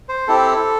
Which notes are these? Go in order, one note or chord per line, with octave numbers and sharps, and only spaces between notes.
C5
C4 E4 G4 A4